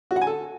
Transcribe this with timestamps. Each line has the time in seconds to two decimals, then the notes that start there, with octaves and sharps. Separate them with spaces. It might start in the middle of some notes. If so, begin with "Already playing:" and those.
0.11 F#4
0.16 F#5
0.21 G#5
0.27 A4